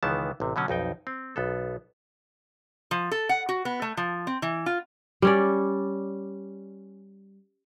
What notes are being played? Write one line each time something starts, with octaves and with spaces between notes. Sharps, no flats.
C#2 D#3 E3 B3 A5
A1 C3
B2 D3 F#3 C#4
B1 F2 D#4 G5
C4
B1 B3 A4
F3
A4
F#5
F#4
B3
A3
F3
C4
E3
F4
G3 C#4 D5